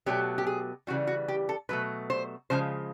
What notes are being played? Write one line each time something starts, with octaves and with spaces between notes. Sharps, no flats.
B2 F#3 A3 G4
G4
G#4
C#3 E3 G3 F#4
F#4
G4
A4
B2 F#3 A3 B4
C5
C#3 F3 G#3 C5